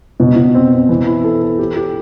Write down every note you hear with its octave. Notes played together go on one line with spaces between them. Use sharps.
B2
B2
C4
C4
E3
E4
A4
A4
G4
G4